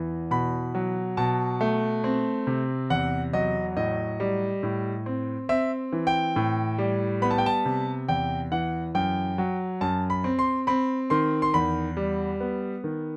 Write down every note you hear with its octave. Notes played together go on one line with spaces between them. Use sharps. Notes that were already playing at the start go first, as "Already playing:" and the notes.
Already playing: E2 E3
B2 B5
F#3
B2 A5
A3
C4
C3
E2 F#5
F#3 D#5
A2 D#5
G3
A2
C4
C4 E5
E3
G5
A2
G3
B3 B5
A5
G5
A5
C3
E2 G5
E3 F#5
F#2 G5
F#3
F#2 A5
B5
C4
C6
C4 B5
D#3 C6
C6
E2 B5
G3
B3
D#3